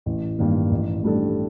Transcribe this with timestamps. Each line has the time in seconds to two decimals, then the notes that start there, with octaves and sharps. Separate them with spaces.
0.06 A1
0.39 G2 D#3 A#3
0.71 A1
1.03 A2 G3 D4 A4